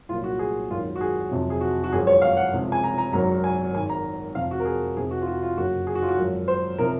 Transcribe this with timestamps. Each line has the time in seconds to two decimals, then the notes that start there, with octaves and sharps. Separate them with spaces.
0.09 C2 A#2 F#3 F4
0.24 F#4
0.39 G#4
0.70 G#1 F#2 D#3 F4
0.96 F#4
1.01 G#4
1.31 F2 C3 F#3
1.50 G#4
1.61 F#4
1.84 F#4
1.92 G#1 F#2 F3 G#4
2.07 C#5
2.22 F5
2.37 F#5
2.53 C#2 C3 F3
2.72 G#5
2.84 A#5
2.98 A#5
3.13 G#1 F#2 D#3 F#3 A#5
3.44 G#5
3.74 G#1 G#2 D#3 G#5
3.89 A#5
4.35 F2 C3 F3 F5
4.51 F#4
4.60 A#4
4.65 G#4
4.96 F2 C3 F3 G#4
5.11 F#4
5.22 F4
5.27 F#4
5.42 F4
5.57 F#1 F#2 C#3 F#4
5.87 G#4
5.95 F#4
6.02 F4
6.09 F#4
6.18 G#1 F#2 F3
6.48 C5
6.78 C3 F3 A#4